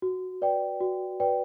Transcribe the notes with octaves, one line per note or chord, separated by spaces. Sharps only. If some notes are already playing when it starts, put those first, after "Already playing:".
F#4
B4 D5 G5
F#4
B4 D5 G5